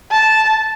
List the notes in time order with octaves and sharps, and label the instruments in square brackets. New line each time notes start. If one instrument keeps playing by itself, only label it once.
[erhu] A5